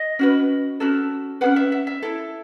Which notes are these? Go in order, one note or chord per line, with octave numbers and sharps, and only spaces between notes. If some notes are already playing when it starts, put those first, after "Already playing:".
Already playing: D#5
C#4 F#4 B4
C#4 F#4 A4
C#4 G#4 B4 F#5
E5
E5
E5
E4 A4